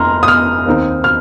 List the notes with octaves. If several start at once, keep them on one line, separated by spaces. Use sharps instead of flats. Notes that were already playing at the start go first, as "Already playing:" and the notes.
Already playing: F1 A#5 C6 F6
D#6
F6
D#2 D#3 C4 D#4
F6